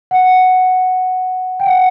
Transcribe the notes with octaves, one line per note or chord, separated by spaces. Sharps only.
F#5
G5
F#5